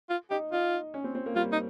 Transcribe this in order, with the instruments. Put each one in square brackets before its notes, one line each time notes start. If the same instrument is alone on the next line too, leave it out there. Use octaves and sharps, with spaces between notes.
[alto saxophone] F4
[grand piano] D#4 [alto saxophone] G4
[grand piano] D#4 [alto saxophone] F4
[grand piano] C#4
C4
C4
A#3
[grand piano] G3 [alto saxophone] F4
[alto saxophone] D#4